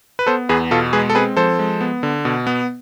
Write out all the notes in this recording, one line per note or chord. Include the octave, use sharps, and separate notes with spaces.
B4
B3 A4 C5
E2 G#4 B4
B2 F4 A4
G#3 G#4 B4
A4
C4 G#4 B4
F3 A4 C5
G#3
B3
D3
B2
B3